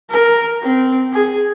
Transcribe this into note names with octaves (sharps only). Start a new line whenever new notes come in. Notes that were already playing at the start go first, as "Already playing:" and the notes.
A#4
C4
G#4